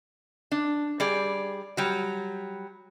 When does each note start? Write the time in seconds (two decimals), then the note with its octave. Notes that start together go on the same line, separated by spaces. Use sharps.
0.52 D4
1.00 G3 G#4 D5
1.77 F#3 G3